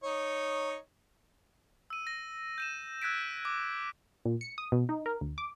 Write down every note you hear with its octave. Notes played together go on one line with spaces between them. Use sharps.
D#4 C#5
E6 D#7
A#6
G6 D#7 E7
E6 F#6 G#6 B6 D7
D6
A#2
C#7
D#6
B2
D#4
A#4
D2
D6